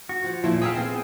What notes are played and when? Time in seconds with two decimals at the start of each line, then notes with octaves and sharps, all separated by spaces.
0.09 F#4
0.24 F3
0.44 E2 A#2 F3 E4
0.62 G#4 E5 F5 G5 A5
0.75 B3 C4 G#4